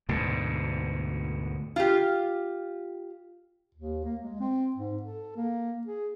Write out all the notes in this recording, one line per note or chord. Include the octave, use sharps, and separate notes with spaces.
D2 G#2 B2
F4 G4
D#2
A#3
G#3
C4
G#2
A4
A#3
G#4